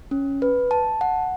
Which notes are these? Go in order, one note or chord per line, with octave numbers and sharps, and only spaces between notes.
C#4
B4
A5
F#5